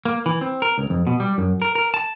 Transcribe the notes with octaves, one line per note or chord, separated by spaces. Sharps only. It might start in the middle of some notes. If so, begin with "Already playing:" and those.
A#3
E3
C4
A#4
C#2
F2
B2
G3
F#2
A#4
A#4
A5